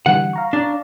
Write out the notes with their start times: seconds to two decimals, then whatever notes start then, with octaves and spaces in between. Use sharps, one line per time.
0.06 D3 E3 G3 F#5
0.33 F5 A#5 C#6
0.53 D4